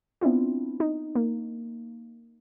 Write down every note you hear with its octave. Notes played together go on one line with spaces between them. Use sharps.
B3 C4 D4 E4 F4
D#4
A#3